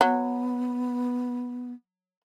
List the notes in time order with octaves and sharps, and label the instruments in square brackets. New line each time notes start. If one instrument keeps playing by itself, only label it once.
[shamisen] F#3 [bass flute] B3